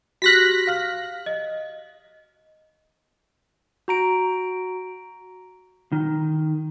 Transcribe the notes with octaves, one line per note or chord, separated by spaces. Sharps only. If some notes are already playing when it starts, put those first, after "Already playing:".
F#4 G4 F6 F#6 A#6 B6
F5 F6
D#5
F#4 A#5 D7
D#3